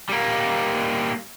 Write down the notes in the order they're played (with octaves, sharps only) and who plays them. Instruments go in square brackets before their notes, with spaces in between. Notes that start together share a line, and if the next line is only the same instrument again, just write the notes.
[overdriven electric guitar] G3 A#3